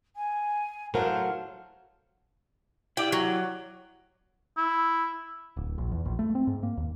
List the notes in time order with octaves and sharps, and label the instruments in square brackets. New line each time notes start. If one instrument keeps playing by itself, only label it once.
[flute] G#5
[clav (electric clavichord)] A2 F#3 [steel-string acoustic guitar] E4 A#4 C5 [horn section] F5 F#5 [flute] A5
[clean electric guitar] E4 G4 D5 [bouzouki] G5
[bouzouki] F#3
[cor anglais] E4
[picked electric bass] D1
A#1
E2
A#1
A3
C4
G#2
A#3
D#2